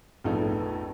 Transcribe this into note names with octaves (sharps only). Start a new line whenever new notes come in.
A#1 F2 A3 B3 D#4 A4